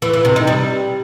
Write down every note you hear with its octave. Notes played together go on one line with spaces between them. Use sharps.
E3
E3
C3
D#4
G3